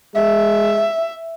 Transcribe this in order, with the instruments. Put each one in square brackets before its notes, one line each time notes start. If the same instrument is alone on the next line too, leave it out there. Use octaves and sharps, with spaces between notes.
[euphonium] G#3 [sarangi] E5